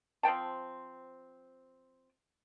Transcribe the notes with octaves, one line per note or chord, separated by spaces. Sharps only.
F3 C4 G5 A5